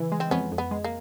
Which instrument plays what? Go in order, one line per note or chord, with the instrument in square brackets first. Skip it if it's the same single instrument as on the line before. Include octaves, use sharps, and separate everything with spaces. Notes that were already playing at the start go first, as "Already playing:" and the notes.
Already playing: [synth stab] C#3 E3
G#3
[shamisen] C4
[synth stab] F2 [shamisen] B3 C#4
[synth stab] F2
[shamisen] B3
[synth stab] G#3
[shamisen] A#3